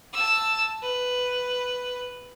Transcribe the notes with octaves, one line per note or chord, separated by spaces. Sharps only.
A5 E6
B4